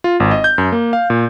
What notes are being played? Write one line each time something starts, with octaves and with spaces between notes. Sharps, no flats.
F4
G#1
D#5
G6
F#2
A#3
F5
A#2